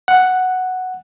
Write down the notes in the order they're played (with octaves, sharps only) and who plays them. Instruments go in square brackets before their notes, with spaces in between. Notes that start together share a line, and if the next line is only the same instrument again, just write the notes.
[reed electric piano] F#5